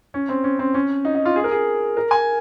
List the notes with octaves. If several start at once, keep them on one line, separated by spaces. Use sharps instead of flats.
C#4
C4
C#4
C4
C#4
D#4
D#4
F4
G#4
A#4
G#4
A#4
G#5